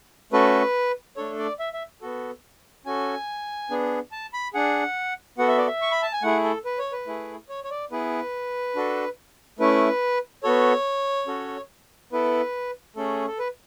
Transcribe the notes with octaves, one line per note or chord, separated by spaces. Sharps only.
A3 C#4 F#4 A4 B4
A3 D4 A4 C#5
D5
E5
E5
B3 F#4 A4
C#4 F#4 A4 G#5
B3 D4 G#4
A5
B5
D4 G#4 F#5
B3 F#4 A4 F#5
E5
D5
E5
C#6
B5
A5
G#5
A3 E4 G#4 F#5
A4
B4
C#5
B4
A3 E4 G#4
C#5
C#5
D5
B3 E4 G#4 B4
D4 F#4 A4
A3 C#4 E4 B4
B3 F#4 A4 C#5
C#4 F#4 A4
B3 E4 A4 B4
A3 C#4 G#4 A4
A4
B4